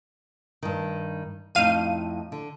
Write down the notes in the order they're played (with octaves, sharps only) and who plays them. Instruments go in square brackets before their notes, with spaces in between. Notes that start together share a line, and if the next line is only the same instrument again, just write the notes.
[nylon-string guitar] G2 D#3
[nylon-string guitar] F2 A2 D#4 [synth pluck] F5 D#7
[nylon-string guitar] D3